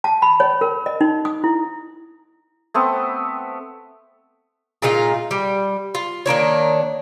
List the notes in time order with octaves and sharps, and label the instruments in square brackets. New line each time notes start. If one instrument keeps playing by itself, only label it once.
[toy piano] A5
B5
C#5
A#4
D#5
D#4
D#6
E4
[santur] A3 B3 C4
[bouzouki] A#2 G#3 D#4 F4
G3
F4
D#3 A#3 D4 C#5